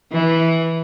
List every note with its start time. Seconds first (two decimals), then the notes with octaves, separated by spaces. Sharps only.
0.13 E3